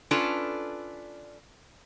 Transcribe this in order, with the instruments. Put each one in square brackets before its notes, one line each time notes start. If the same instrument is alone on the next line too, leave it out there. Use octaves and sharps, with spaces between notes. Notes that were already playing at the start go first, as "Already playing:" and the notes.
[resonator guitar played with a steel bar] C#4 D4 F4 A4 B4